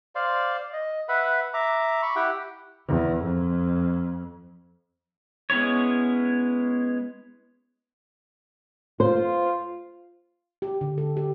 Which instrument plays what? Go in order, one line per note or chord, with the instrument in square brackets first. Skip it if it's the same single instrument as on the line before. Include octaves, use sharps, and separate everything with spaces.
[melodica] C5 D5 F5 C6
D#5
B4 E5 F#5 B5
E5 A#5 D6
B5 C#6
E4 G4 F#5 G5
[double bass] E2
F2
[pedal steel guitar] G#3 B3 C#4 E4 C#5
[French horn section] F4 [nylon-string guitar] C5
[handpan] G4
D3
A4
G4